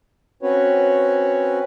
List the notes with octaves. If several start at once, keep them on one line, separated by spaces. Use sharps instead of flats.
C4 C#4 F#4 B4 C#5